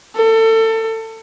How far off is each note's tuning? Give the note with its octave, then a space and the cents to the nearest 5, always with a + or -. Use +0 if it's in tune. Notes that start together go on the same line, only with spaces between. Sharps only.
A4 +25